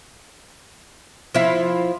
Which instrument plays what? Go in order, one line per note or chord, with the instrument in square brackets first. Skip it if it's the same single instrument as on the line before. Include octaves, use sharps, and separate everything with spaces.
[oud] F3 E4